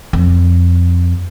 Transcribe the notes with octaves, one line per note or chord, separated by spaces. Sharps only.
F2